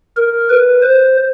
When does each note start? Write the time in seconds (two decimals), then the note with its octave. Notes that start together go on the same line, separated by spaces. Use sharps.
0.17 A#4
0.50 B4
0.82 C5